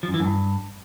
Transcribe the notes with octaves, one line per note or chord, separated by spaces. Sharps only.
F3
F#2
E3
F#2
G2